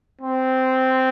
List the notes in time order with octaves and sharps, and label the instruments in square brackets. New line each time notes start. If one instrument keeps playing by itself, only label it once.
[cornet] C4